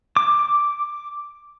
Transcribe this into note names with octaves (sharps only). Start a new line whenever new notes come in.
D6